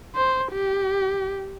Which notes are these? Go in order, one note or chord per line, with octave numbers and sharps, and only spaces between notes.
C5
G4